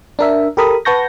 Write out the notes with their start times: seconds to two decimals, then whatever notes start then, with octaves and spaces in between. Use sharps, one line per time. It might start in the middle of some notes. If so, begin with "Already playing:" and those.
0.19 D4 A#4 E5
0.57 G4 A4 A#4 B5 D#6
0.85 B4 F#5 A5 C#6 G6 A#6